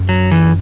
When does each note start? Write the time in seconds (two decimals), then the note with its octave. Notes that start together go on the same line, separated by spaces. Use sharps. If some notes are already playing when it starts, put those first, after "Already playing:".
Already playing: F#2
0.09 F#3
0.31 E3